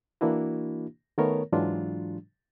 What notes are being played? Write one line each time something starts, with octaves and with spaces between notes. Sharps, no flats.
E3 A#3 D4 E4 F#4
D#3 A3 B3 A#4 C#5
G#2 E3 F#3 G#3 D4 F4